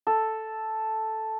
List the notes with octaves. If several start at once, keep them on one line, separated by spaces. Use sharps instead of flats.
A4